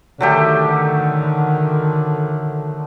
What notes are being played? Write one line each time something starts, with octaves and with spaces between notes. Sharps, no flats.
D3 D#3 F#3 A3 G4